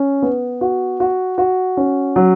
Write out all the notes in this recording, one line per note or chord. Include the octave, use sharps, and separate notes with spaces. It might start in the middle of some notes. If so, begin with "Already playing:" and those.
Already playing: C#4
B3
F#4
F#4
F#4
C#4
F#3